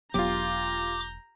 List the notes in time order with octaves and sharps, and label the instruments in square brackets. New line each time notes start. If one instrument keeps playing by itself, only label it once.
[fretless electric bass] E1 F#3 B3 [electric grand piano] F4 G4 [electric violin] A#5 G6 [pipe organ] D6